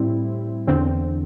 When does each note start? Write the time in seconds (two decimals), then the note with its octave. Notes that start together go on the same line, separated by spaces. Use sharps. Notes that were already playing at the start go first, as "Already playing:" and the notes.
Already playing: A2 G3 C4 E4
0.67 E2 D3 C4